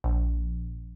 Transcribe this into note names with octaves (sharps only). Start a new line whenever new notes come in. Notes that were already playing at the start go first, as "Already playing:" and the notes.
A#1